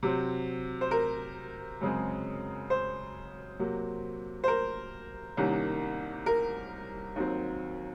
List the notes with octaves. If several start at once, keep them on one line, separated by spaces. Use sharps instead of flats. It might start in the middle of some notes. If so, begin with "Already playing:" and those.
C3 F#3 C4
C5
A#4
F#2 C#3 G#3 C4
C5
C3 F#3 A#3
C5
A#4
C2 C3 D#3 A#3 C#4
A#4
D#2 D#3 F#3 C4